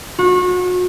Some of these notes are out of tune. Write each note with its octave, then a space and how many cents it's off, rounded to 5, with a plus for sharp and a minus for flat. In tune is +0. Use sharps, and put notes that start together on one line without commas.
F#4 -35